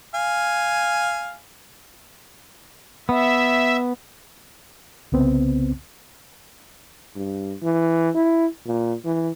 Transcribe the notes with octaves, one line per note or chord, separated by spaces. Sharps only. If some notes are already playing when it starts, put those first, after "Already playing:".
F5 G#5
B3 E5
C2 C#3 B3 C4
G2
E3
E4
A#2
E3